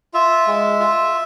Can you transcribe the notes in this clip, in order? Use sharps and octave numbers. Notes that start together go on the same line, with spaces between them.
F4 E5
G#3
F4